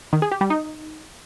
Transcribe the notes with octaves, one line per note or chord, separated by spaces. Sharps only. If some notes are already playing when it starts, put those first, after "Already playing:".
D#3
G#4
G4
G3
D#4